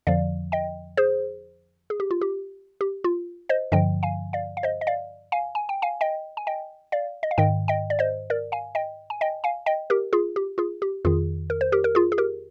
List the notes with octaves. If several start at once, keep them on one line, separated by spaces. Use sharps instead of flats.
F2 D3 F3 D5 F5
D#5 G5
G#4 C5
G#4
G4
F4
G4
G4
F4
C5 D#5
G2 D3 F3 D#5 G5
F5 G#5
D5 F5
F5
C5 D#5
D#5
D5 F5
F5 G#5
G#5
G5
F5 G#5
D#5 G5
G#5
D#5 G5
D5 F5
D#5
F5
G#2 D#3 D#5 G5
D#5 G5
D5
C5 D#5
A#4 D5
F5 G#5
D#5 G5
G#5
D#5 G5
F5 G#5
D#5 G5
G4 A#4
F4 G#4
G4
F4 G#4
G4
F2 D#3 F4 G#4
A#4
C5
G4 A#4
A#4
F4 G#4
G#4
G4 A#4